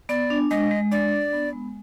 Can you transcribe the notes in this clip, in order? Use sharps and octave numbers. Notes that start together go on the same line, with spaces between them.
B3 D5
D4
G#3 D#5
G#3
D4 D5
D4
B3
G#3